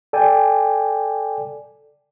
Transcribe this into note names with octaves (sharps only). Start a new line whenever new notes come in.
A4 D5 G5 G#5